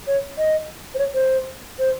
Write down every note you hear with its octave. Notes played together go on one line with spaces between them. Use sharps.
C#5
D#5
C5
C#5
C5
C5